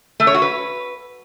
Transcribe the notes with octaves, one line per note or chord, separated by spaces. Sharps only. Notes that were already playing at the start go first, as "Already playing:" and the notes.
A3
C#5
F#4
B4